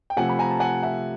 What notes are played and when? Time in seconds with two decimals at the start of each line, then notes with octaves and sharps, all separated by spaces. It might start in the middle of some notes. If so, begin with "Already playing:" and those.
0.10 G5
0.17 C3 F3 A3 F#5 G#5
0.29 B5
0.39 G#5 A#5
0.50 A5
0.60 F#5 G#5
0.83 E5 F#5